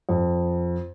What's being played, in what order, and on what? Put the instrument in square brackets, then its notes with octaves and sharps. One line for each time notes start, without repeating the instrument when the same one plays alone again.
[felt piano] F2